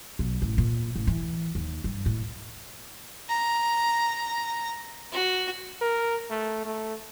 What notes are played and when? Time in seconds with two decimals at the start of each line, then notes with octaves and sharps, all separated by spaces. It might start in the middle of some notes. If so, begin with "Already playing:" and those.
0.19 B1
0.42 A1
0.58 A#2
0.96 A1
1.07 E3
1.55 D#2
1.84 G2
2.06 A2
3.29 A#5
5.12 F#4
5.81 A#4
6.30 A3
6.65 A3